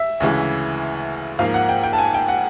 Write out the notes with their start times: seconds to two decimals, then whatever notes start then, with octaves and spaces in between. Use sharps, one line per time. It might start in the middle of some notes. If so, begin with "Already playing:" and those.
Already playing: E5
0.20 D2 C#3 E3 G#3
1.39 G#2 F3 A#3 F5
1.54 F#5
1.69 G5
1.84 G5
1.93 A5
1.98 G#5
2.14 G5
2.28 F#5